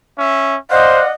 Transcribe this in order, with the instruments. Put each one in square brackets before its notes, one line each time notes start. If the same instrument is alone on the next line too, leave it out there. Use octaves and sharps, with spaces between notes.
[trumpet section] C#4 E5
[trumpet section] C5 [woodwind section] D5 F5 F#5 [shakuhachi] D#5